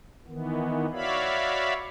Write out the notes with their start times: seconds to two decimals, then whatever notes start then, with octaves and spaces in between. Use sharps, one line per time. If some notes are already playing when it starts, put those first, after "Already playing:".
0.28 D#3 E3 B3
0.93 F#4 C#5 D5 E5 F5 B5